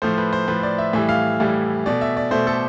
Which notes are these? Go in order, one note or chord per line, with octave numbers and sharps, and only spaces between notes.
A2 F3 A3 C5
B4
C5
A2 F3 A3 B4
D5
E5
A2 E3 G3 E5
F5
A2 E3 G3
B2 A3 D5
E5
D5
B2 A3 C5
A4